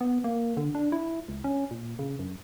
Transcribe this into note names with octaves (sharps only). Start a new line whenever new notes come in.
B3
A#3
D3
D4
E4
C#2
C#4
A#2
C#3
F#2